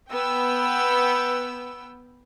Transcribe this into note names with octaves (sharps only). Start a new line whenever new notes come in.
B3 G5 E6